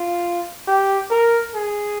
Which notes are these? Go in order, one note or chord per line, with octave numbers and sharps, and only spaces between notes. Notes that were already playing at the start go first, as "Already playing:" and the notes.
Already playing: F4
G4
A#4
G#4